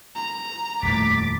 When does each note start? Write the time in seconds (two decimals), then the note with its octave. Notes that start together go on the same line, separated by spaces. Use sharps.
0.15 A#5
0.83 D#1 F2 A2 D6 A6 B6